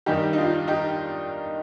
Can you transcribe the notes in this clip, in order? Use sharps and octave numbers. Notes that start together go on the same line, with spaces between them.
G2 D#3 G3 D#4 G4
D#4
D4 F4
D#4 G4